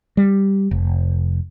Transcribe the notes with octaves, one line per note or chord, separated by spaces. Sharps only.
G3
F1